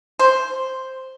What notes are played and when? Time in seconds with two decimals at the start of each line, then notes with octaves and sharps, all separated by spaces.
0.19 C5